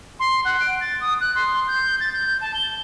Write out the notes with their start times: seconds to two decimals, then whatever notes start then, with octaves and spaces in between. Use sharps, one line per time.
0.20 C6
0.45 F#5
0.61 D7
0.81 A6
1.01 D#6
1.21 F#6
1.35 C6
1.68 G6
2.00 A6
2.13 G6
2.41 A5
2.54 G7